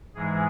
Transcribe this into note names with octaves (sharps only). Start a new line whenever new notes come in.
G#2 E3 G#3 G#4